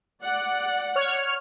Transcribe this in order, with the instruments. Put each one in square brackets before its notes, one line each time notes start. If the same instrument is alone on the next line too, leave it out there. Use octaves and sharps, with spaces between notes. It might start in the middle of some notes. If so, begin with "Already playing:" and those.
[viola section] D5 F#5
[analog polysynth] C#5 F6